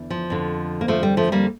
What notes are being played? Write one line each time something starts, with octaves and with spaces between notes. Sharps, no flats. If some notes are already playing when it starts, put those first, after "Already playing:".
Already playing: E2 D3
F3
F2 D3
A#3
F3 A3
G3
F3 A3
G3 A#3